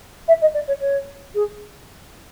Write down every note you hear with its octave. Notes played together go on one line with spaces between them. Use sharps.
E5
D#5
D5
C#5
C#5
G#4